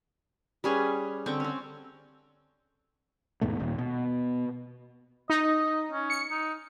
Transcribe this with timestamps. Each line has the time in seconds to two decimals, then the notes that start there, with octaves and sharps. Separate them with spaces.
0.64 G3 C#4 G#4 B4
1.26 D3 C4 G5 C#6
1.40 C4 C#4
3.41 D#2 G#2 B2 A3
3.60 D#1 D#2 A#2
3.78 B2
5.30 D#4 D#5
5.92 C#4
6.10 C#7
6.31 D#4